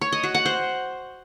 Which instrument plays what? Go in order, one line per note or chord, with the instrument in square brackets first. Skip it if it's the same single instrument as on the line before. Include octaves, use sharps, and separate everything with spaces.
[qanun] C#5
D#5
F#4
F#5
C5